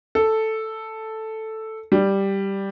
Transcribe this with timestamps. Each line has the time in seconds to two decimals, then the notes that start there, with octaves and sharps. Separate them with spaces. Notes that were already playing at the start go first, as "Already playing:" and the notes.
0.15 A4
1.92 G3